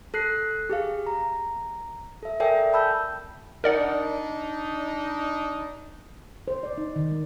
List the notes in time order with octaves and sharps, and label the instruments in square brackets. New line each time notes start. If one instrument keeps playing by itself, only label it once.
[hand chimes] A4 F#6 C7
G4 G#4 F5
A#5
A4 E5
A4 A#4 D5 E5 G5 G#5
G5 A5 B5 E6 G6
[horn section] D4 D#4 [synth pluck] A#4 D5 F#5
[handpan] C5
D5
D#4
D#3
G#3